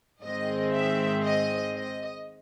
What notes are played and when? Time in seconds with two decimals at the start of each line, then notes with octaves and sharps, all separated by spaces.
0.23 G#2 D#3 G#3 C4 D#5
0.73 E5
1.23 D#5
1.73 D#5